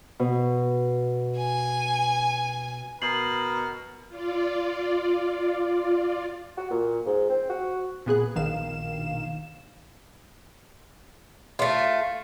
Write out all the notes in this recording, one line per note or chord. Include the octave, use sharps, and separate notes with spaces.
B2
G#5
B2 A#4 C7 F#7
F4 D5
F#4
A#2
G#2
C4
F#4
A#2 B3 G#4 F#6
A#1 B2 D#3 F5 E7
A3 F4